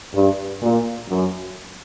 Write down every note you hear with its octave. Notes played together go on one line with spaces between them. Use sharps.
G2
A#2
F#2